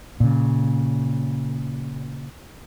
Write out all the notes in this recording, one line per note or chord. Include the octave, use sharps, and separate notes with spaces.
A#2 C#3